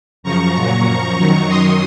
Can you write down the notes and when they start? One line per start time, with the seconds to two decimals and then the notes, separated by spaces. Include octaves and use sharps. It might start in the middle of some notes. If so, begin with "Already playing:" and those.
0.23 F#2 C#3 F3 A#5 C#6
0.54 A#2 F#3
0.85 F#2 F3
1.17 F#2 D#3 F#3
1.47 F#2 D#3 F#3 C6 D#6